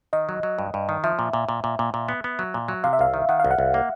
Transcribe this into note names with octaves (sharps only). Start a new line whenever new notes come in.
D#3 D#5
F#3
F#3
G2
G2
D#3
F3 E5
A#2
A#2
A#2
A#2
A#2
A#2
B3
B3
F#3
A#2
F#3
C3 F5
E5
C2 F5
D#3
D#3 F#5
C2 F5
F#5
C2
A#3